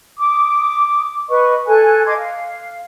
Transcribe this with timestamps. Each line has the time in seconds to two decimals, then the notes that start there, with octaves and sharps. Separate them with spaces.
0.18 D6 D#6
1.30 B4 D#5 C#6
1.68 A4 G#5 F#6
2.06 D#5 C6 D6 G#6
2.17 F5